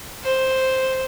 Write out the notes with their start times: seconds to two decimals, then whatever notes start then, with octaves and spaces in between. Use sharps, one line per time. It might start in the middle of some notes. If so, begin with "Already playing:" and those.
0.24 C5